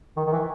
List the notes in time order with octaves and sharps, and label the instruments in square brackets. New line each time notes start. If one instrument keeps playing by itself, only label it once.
[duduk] D#3
D#3
E3